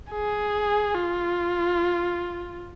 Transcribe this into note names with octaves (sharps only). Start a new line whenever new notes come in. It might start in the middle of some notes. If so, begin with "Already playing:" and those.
G#4
F4